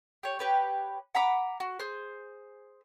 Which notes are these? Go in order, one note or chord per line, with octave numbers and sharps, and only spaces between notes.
G4 C#5
G4 B4 C#5
F#5 A#5 B5 D6
F#4
G#4 C5